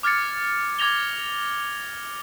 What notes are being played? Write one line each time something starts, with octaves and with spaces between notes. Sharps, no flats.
D6 F6 G#6 A6 C#7
D6 G#6 A#6 F7 G7